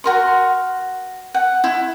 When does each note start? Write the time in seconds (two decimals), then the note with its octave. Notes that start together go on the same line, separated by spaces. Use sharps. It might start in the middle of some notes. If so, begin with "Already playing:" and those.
0.04 F#4 A#4 C6
1.34 F#5
1.64 E4